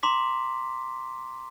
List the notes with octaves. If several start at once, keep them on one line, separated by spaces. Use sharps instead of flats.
A#5 C6 D6 B6